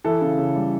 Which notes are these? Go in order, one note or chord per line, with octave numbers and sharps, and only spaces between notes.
E3 A4
C#3
C#3
G3